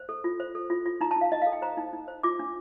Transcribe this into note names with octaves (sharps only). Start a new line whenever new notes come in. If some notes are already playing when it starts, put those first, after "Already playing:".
Already playing: C5
A4
F4
C5
A4
F4
F4
D#4 A#5
A5
D#4 F5
D#4 D#5
F5
A4
G5
C5 A#5
D#4
D#4
C5
F4 D6
D4